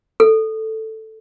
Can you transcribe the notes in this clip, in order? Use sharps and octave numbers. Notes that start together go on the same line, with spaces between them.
A4